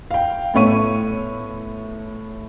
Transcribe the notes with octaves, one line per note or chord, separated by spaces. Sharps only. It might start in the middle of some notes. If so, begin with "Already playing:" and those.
F5 G5
A2 A3 B3 C#5 C#6 D#7